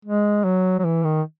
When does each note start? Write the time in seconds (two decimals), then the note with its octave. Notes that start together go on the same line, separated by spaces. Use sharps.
0.05 G#3
0.44 F#3
0.79 F#3
0.84 E3
1.04 D#3